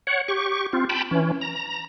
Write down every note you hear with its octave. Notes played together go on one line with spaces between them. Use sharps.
C#5 F#5
G4 C#6
C4 F4
G5 A5 B5
E3 C#4
A#5